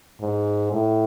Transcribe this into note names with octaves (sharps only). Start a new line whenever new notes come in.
G#2
A2